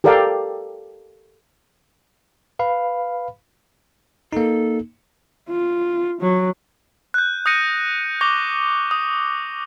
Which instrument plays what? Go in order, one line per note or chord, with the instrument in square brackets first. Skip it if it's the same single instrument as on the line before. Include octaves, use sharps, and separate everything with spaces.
[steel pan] G4 A4 A#4 D5 F5 G5
[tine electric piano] B4 F5 B5
[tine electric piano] A#3 D#4 [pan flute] A4
[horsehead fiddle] F4
F#3
[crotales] F#6 G6
D#6 F#6 G6 A#6 C#7 D#7
C#6 D6 G6 A#6 F7 G7
D#6